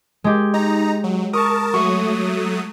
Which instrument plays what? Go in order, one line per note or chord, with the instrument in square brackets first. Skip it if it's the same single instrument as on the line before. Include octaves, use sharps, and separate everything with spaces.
[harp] G#3 G4
[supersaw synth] D#4 A#5
F#3
[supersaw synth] A#4 A5 [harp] C#6 D#6
[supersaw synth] F#3 A3 D#6 [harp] C#6